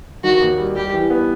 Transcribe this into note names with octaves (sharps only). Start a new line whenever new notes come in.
D#3 F#4
D#2
G3
G3 G4
E3
B3